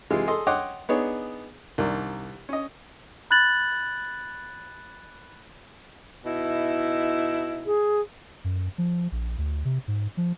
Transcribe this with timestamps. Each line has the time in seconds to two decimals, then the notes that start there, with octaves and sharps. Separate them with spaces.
0.10 C3 E3 G#3 F4
0.27 G#4 A4 D#5 C6
0.47 C#5 D#5 F#5 G5 C6 D6
0.89 B3 D4 D#4 G#4 C#5
1.78 C2 D#3 D4 A#4
2.49 C#4 D#5
3.31 B5 F#6 G#6 A6 F#7
6.25 B2 D#4 E4
7.66 G#4
8.44 F#2
8.78 F3
9.12 A#1
9.38 D2
9.65 C3
9.88 G#2
10.17 F3